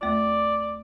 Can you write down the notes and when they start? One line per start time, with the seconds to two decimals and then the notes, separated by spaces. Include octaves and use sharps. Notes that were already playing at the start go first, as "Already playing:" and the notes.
0.01 D#2 A3 F4 D5